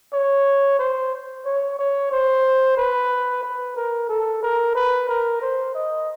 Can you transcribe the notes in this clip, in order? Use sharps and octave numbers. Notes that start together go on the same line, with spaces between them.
C#5
C5
C#5
C#5
C5
B4
B4
A#4
A4
A#4
B4
A#4
C5
D#5